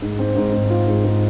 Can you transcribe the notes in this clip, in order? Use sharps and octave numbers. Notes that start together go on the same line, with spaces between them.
G#2
C4
G#2
G#2
F4
G#2
G#2